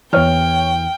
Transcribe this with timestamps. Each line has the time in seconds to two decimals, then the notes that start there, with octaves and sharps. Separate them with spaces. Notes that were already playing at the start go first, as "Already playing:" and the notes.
0.13 E2 E3 C#5 G5 F6